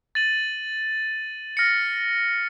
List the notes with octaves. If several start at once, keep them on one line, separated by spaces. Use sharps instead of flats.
A6 D#7 F#7
F6 A#6 C#7